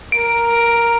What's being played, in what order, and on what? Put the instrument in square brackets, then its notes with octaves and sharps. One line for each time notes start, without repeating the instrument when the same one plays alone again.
[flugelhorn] A#4 [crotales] D7